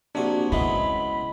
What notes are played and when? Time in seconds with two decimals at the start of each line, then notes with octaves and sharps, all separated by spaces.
0.15 A#1 C3 D4 F#4 G#5
0.52 C#3 F#3 G#3 B3 E4 B5